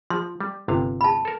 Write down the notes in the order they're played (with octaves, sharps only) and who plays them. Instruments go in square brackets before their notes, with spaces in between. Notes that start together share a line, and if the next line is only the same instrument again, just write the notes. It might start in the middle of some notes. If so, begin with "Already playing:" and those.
[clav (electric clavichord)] F3 [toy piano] C6
[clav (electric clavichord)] G3
G1 C3 F5
[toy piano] A5 B5
[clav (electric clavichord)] A4 A#4